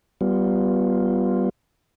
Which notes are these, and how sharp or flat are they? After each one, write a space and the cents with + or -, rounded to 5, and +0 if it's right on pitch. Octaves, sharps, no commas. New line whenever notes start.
G3 -20 B3 -5 F4 +0